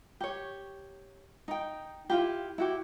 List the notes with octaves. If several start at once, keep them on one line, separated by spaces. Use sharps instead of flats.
G4 C#5
D#4 G5
E4 F4 G4
E4 F#4 G4